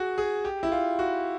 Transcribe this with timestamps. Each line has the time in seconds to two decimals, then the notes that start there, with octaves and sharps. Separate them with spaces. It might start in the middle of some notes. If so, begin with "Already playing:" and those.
Already playing: F#4 G#4
0.18 G#4
0.45 G4
0.63 E4
0.72 F4
0.99 F#4